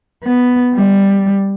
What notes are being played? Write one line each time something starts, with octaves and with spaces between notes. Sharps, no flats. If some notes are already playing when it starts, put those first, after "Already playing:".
B3
G3